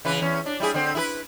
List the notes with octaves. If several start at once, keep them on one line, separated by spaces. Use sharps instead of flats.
C#3 E3 B4
E2 C#4
D4
G3 E4 G#4
D3 C4
E4 G#4 B4